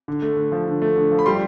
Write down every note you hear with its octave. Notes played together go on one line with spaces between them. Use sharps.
D3
A3
D3
F3
D3
A3
D3
F3
B5
G3 C6